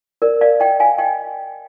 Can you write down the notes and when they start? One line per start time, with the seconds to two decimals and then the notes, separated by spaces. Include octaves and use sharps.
0.22 A#4 D5
0.41 D5 F5
0.60 D#5 G5
0.80 F5 G#5
0.98 D#5 G5